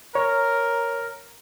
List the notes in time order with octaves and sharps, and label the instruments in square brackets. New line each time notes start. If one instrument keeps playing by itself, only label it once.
[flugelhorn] A#4 [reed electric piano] C#5